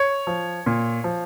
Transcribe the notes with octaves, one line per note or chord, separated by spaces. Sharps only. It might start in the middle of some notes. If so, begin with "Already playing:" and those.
Already playing: C#5
F3
A#2
F3